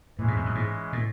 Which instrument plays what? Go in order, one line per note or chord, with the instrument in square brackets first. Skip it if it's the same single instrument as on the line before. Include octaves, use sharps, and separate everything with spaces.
[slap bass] A2 [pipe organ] E3 G#3 C#4
[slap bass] G#2
E2
F#2
G#2
A2